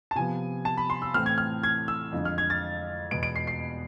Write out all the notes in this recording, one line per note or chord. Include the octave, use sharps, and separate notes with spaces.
A5
C3 F3 B3 G#5
A5
B5
C6
E6
A2 E3 A3 C4 F6
G#6
F6
G#6
E6
F2 D3 G#3
F6
G#6
A6
E2 B2 G#3 B3 D7
D7
C7
C7